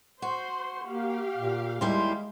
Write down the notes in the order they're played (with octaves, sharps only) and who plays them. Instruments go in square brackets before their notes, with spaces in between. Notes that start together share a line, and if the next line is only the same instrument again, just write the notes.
[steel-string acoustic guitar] F#4 [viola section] C5 C6
[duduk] A#3 [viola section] G4 F5
[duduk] A#2
[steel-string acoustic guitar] D#2 G3 E4 [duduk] G#3 [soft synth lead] C6